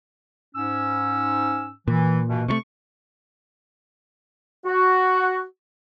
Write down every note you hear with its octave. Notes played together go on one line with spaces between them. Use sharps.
G#2 C#4 E6
A#2 E3
G2 B2 E3
C3 F3 A3 C#6
F#4